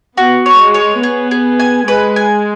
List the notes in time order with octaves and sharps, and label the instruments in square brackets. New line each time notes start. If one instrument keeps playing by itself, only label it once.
[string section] B3 [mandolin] F#4
[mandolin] C#5
[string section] G#3
[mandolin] C#5
[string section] B3 [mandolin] G#4
[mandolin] G#4
G#5
[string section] G#3 [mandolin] B4
[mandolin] G#5